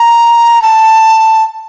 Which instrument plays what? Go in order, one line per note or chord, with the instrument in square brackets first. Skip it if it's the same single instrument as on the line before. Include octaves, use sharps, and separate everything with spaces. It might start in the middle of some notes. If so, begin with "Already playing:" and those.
Already playing: [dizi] A#5
A5